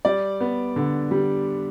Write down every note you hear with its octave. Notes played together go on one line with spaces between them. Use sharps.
G3 D5
B3
D3
G3